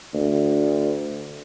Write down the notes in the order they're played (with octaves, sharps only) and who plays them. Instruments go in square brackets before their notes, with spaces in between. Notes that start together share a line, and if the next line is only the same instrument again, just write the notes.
[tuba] D2